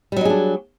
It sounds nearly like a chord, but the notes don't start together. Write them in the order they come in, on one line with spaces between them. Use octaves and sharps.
G3 F#3 D#4 G#4 D4